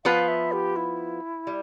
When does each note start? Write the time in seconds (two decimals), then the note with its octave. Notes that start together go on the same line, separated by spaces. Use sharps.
0.05 F3 B3 F4 B4 F5
0.28 E5
0.52 G4
0.76 E4
1.47 G3